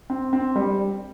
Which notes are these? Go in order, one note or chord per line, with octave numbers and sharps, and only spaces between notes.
C4
C4
G3